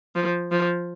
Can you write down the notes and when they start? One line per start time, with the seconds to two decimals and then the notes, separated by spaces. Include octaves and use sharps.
0.15 F3
0.52 F3